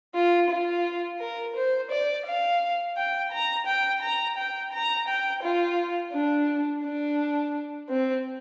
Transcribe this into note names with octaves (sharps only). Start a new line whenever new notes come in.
F4
F4
A#4
C5
D5
F5
G5
A#5
G5
A#5
G5
A#5
G5
F4
D4
D4
C4